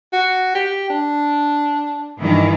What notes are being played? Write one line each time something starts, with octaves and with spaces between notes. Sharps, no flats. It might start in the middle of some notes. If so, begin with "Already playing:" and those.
F#4
G4
D4
G2 D#3 E3